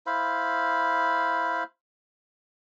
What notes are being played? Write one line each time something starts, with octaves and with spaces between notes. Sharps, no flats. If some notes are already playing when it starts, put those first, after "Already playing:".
E4 C5 F5 B5